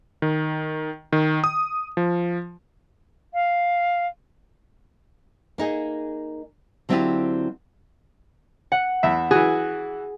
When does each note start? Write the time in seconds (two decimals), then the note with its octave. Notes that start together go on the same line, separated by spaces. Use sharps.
0.22 D#3
1.13 D#3
1.44 D#6
1.97 F3
3.33 F5
5.58 A#3 D#4 G#4
6.89 D3 F#3 C4 E4 F4 G4
8.72 F#5
9.03 E2 E5
9.31 E3 F#4 G#4